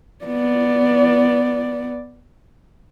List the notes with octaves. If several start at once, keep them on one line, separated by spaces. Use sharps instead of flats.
B3 D5